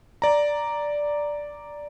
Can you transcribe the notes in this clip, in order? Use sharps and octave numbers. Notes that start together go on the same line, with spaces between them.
D5 A#5